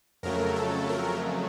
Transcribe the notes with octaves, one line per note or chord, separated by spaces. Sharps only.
F2 C#3 F#3 A3 A#4
A4
A#4